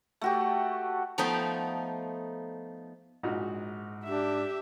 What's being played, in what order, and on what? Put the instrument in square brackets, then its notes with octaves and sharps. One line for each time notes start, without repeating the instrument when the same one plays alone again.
[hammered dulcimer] A3 F#4 G4
[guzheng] F3 A3 B3 D#4 G5
[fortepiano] A#1 D#4 F#4 [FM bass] G#2
[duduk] D4 [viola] G4 E5